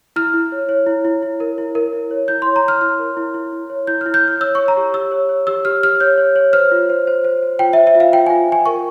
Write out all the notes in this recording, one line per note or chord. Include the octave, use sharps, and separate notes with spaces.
E4 F6
E4
C#5
C#5
E4
E4
E4
A#4
E4
A#4
E4
C#5
E4 G6
C6
C#5
A#5
E4 F6
E4 F6
A#4
E4
E4
E4
C#5
E4 G6
F6
E4
G6
E4 F6
C#5 E6
C#6
C#5
A#5
G4
G4 E6
C#5
C#5
G4 E6
G4 F6
G4 F6
C#5 G6
C#5
C#5
C5 F6
F4
C5
C5
C5
C5
F4 G5
E5
C5
E5
F4
F5
F4 G5
G#5
F4
F4 G#5
A#4 C#6